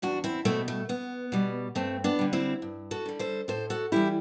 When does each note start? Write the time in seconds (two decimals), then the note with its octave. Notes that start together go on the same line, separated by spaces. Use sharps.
0.02 E2 D4 F#4
0.24 C4 E4
0.45 B2 G3 A3 C4
0.68 A3
0.89 E2 B3
1.32 B2 G3
1.75 G2 A3 C4
2.04 B3 D4
2.19 D3 G3
2.33 C4 E4
2.62 G2
2.91 F#4 A4
3.05 D3 G3
3.19 A4 C5
3.48 A2 A4 C5
3.70 F#4 A4
3.92 E3 G3 E4 G4